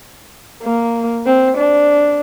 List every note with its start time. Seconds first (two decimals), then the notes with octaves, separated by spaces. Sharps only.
0.63 A#3
1.26 C4
1.57 D4